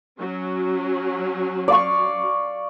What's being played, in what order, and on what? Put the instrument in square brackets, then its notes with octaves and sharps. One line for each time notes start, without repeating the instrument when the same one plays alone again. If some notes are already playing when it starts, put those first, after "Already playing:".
[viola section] F#3 C#4
[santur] D5 F5 C#6